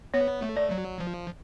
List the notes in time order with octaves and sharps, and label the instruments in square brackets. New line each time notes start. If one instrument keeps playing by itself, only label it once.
[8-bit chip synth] B3 [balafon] C#5
[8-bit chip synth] A3
[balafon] D5
[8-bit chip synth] F#3
F3